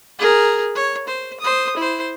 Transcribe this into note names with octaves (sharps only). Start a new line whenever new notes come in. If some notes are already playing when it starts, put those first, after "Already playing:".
G#4 A#4
C#5
C5
C5 D#6
E4 C5